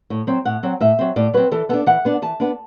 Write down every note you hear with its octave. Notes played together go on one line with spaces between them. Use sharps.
A2
F#3 C4
A2 F#5
F#3 C4
A2 E5
F#3 C4
A2 D5
F#3 C4 B4
E3 A4
B3 D4 A4
E3 F#5
B3 D4
E3 A5
B3 D4